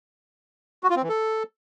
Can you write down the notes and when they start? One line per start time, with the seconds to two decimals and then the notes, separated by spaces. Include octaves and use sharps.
0.84 F#4
0.90 F4
0.96 C4
1.03 E3
1.09 A4